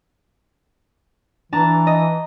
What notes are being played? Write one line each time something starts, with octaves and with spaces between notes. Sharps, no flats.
E3 D4 A5 A#5
D#5